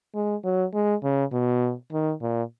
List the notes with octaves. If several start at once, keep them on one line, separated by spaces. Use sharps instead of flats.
G#3
F#3
G#3
C#3
B2
D#3
A#2